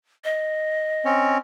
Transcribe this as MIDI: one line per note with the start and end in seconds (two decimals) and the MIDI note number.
0.24 1.36 75
1.05 1.38 60
1.05 1.38 61
1.05 1.38 73